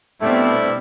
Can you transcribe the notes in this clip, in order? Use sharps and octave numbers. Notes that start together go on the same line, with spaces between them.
B2 G3 A3 C4 D4 E4